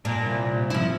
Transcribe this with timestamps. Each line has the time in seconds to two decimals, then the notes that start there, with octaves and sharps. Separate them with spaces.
0.05 A#2 D4
0.25 C2
0.70 F3 E4